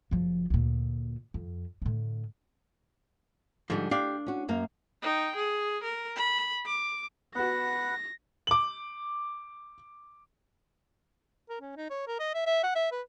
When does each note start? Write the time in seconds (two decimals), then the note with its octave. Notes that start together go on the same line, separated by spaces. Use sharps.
0.11 F#1 F3
0.50 D2 A#2
1.34 F2
1.82 A2 D3
3.70 G#2 D3 F3 G3 F#4
3.91 D4 G4 F5
4.27 C#4 F#4
4.48 F#2 A#3 F5
5.02 D#4 G5
5.36 G#4
5.83 A#4
6.16 B5
6.66 D6
7.35 B3 F#4 B4 F#5 A#6
8.47 D6 F#7
11.49 A#4
11.61 C#4
11.76 D#4
11.90 C#5
12.07 A#4
12.19 D#5
12.34 E5
12.46 E5
12.63 F#5
12.75 E5
12.92 B4